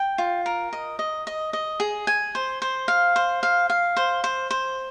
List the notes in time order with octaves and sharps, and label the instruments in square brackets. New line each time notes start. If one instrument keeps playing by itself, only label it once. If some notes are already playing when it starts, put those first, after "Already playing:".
Already playing: [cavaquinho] G5
F4
A#4
D#5
D#5
D#5
D#5
G#4
G#5
C5
C5
F5
C5
F5
F5
C5
C5
C5